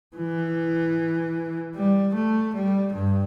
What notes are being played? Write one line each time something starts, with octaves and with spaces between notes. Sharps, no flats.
E3
G3
A3
G3
G2